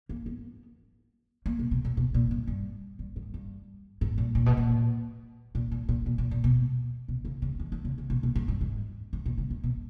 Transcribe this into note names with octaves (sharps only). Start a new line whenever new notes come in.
A#3
B3
A#3
B2
B2
A#2
B2
A#2
G2
G2
G2
G#2
G2
G#2
A#2
A#2
B2
A#2
A#2
A#2
A#2
A#2
A#2
A#2
B2
B2
C#3
C#3
D#3
E3
C#3
C#3
B2
B2
G#2
G2
G#2
G#2
A#2
C#3
D#3
B2